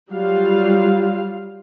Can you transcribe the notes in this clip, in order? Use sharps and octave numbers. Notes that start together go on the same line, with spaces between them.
F#3 G3 F4 F5